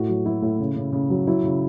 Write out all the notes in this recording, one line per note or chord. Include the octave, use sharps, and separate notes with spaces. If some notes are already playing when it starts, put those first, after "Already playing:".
Already playing: A2 F#4
F#3
F#3 E4
A2
C#3
C#3
C#3
F#3
F#3 E4
C#3